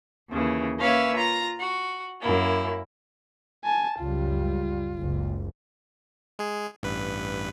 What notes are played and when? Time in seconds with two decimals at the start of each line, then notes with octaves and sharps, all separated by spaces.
0.29 D#2 C#3 E3
0.78 A#3 C#4 B4 C#5 E5 F5
1.15 F4 A#5 A#6
1.58 F#4
2.20 F#2 A#3 E4
3.65 G#5 A5
3.99 C#2 F#2 G3 F4
4.96 F#1 C#2
6.39 G#3 G#4
6.83 A1 G2 B4